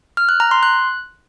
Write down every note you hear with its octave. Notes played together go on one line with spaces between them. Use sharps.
F6
F#6
A#5
C6
F#6